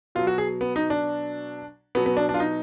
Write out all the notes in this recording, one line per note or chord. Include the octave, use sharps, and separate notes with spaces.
B2 F#3 F4
F#4
G#4
B3
D#4
D4
B2 F#3 B3
B3
D4
D4
F4
D#4